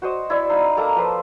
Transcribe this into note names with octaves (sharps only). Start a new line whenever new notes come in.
F#4 C5 D#5
E4 D5 E5
D#4 F5 B5
A#3 A4 A#5 D6
F3 B4 C5 C6